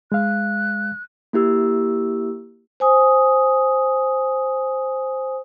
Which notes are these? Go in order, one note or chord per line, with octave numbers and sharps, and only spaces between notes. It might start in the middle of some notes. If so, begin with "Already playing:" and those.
G#3 F5 F#6
A#3 E4 G4 E6
C5 G#5 D#6